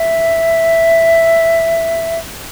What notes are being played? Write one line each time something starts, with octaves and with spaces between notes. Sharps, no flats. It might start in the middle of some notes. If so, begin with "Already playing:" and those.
Already playing: E5